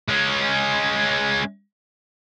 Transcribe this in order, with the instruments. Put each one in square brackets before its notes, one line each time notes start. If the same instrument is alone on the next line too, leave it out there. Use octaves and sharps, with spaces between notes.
[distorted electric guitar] G#3 C#4